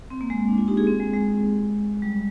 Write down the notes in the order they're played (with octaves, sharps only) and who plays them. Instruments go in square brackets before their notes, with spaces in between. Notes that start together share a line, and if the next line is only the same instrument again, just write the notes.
[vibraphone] C4
A#3
G#3
A#3
D4
F4
D#4 G4
F4 G#4
C4
G#3
G#3
G3